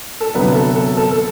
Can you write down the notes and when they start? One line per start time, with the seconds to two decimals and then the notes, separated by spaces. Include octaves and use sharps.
0.20 A4
0.34 D2 C3 F#3 B3 B4
0.47 B4
0.55 A4
0.76 A4
0.97 A4
1.11 A4